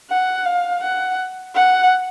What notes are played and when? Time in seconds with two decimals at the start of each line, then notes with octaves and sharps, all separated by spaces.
0.11 F#5
0.46 F5
0.83 F#5
1.55 F#5